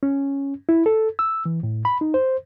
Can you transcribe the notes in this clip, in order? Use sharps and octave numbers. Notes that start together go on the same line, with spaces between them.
C#4
E4
A4
E6
E3
A2
B5
D#4
C5